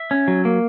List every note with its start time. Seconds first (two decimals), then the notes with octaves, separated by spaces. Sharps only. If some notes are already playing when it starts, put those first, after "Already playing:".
Already playing: E5
0.11 C#4
0.28 F#3
0.45 A#3